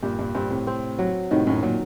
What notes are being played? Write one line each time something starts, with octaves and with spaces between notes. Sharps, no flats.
G2 A#2 G4
G2 A#2
G2 A#2 C4
A2 C3
C4
F#3
A2 C3 D#3
F#2 A2
A#2 F#3